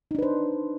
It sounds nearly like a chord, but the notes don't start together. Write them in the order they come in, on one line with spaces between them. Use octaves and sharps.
D#4 D4 B4 C5